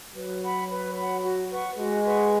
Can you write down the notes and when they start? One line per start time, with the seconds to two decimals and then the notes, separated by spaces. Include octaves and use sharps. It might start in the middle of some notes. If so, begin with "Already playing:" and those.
0.14 F#3 B4
0.42 F#5 B5
0.69 B4
0.96 F#5 B5
1.23 F#4
1.50 B4 F#5 C#6
1.77 G#3 F#4
2.04 B4 F#5 C#6